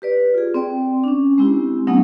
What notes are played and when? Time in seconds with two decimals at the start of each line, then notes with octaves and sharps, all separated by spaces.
0.02 G4 B4 D5
0.34 F4 G#4
0.54 C4 D5 G5
1.04 C#4 D4
1.38 G#3 C4 E4 G4
1.87 F#3 G#3 A3 B3 C#4 D#4